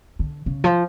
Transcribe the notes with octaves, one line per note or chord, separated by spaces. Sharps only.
D3
C#3
F3